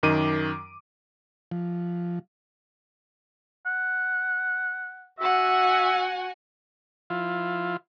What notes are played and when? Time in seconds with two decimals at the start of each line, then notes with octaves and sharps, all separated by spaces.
0.03 F#2 D#3 D6 D#7
1.51 F3
3.66 F#5
5.20 F#4 E5 F#5 G#5
7.10 F3 E4 F4